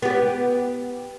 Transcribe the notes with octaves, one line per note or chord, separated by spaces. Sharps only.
B3 G4